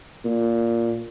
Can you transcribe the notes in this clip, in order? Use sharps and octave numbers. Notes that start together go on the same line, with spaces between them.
A#2